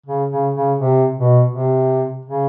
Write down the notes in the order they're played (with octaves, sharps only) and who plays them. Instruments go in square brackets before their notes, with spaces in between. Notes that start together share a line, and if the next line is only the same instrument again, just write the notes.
[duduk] C#3
C#3
C#3
C3
B2
C3
C#3